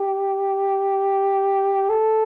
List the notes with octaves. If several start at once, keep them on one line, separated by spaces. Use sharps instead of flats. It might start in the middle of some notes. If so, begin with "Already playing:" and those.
Already playing: G4
A4